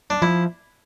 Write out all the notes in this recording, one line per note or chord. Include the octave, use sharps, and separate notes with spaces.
D4
F3 E4